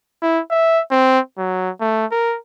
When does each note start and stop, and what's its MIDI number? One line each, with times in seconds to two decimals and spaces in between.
0.22 0.41 64
0.51 0.81 76
0.91 1.19 60
1.38 1.70 54
1.80 2.06 57
2.11 2.37 70